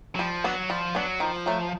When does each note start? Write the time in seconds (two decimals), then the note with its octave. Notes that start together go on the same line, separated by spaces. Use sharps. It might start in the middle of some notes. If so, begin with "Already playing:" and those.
0.15 F#3
0.19 F3 G3
0.44 F#3 B3 D4
0.70 F3 G3
0.95 F#3 B3 D4
1.20 D#3 F3
1.46 F#3 A3